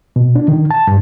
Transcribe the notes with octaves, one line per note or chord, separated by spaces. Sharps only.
B2
D4
D#3
A5
G2